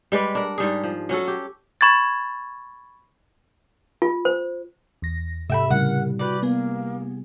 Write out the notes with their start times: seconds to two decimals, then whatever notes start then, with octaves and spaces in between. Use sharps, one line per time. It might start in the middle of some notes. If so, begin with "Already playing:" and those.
0.12 G3 G#3 B4 D5
0.35 D4 A#4
0.58 G#2 G3 G#4
0.84 F3
1.09 F#3 C#4 F#4 A4
1.28 G4
1.81 B5 C#6 G#6 A6
4.02 F4
4.25 C5
5.02 E2 A#6
5.50 G#2 C3 A4 E5 G5 B5
5.71 A2 C#3 G3 E4 A#4 F#5
6.19 F#4 G4 B4 D5
6.43 A#3 B3 G#4